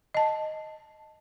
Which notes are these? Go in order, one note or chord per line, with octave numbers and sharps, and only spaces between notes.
D#5 A5